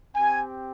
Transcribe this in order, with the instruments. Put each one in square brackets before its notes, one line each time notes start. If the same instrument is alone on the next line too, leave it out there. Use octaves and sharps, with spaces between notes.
[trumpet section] C4 G4 G#5